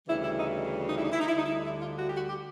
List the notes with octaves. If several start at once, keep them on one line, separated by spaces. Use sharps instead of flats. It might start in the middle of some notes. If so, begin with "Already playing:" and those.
D2 C#3 E3 G3 E4
E4
D#4
D#4
E4
D#4
E4
D#4
E4
D2 D3 G3 D#4
E4
D#4
E4
F4
F#4
G4
F#4
G4